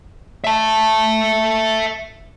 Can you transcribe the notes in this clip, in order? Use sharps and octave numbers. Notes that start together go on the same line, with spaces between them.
E5 A5